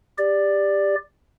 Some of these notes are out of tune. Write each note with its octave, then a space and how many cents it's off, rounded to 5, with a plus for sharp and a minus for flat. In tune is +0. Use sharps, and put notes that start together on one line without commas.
G4 +20 D5 +0